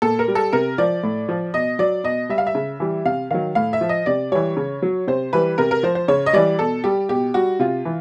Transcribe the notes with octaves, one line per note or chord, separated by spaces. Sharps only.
A#2 A4
A#4
G3
A4
C3 A#4
F3 D5
A2
F3
B2 D#5
F#3 D5
B2 D#5
G3 E5
F5
E5
C#3
E3 G3
C3 F5
D#3 F#3 F5
A2 F5
E5
F3
D#5
C3 D5
E3 G3 C#5
C#3
F#3
C3 C5
E3 G3 B4
C3 A#4
A#4
F3 C5
C5
C#3 C#5
D#5
E3 G3 D5
B2 A4
G3 G4
B2 G4
G3 F#4
C3 F4
E3